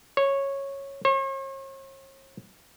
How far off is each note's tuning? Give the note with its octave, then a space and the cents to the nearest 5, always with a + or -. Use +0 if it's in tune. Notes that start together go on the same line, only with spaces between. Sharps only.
C#5 -10
C#5 -45